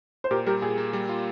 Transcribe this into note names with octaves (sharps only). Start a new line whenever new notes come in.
C5
A#2 G4 A#4
G3 G4 A#4
A#2 G#4
A#3
G3
F4